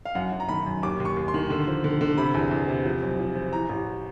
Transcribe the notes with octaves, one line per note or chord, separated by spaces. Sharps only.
F5
F#2 F#5
F#2
A#5
D#3 B5
F#2
D#2 D6
D#2
C#6
D#2
C6
D#3
D3
F3
D3
D3
C3 B5
E2
E2
C3
F3
B1
F3
F3
E3 A#5
A1